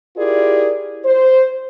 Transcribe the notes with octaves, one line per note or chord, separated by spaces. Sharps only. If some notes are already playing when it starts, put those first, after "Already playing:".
E4 F4 G4 G#4 A#4 D5
C5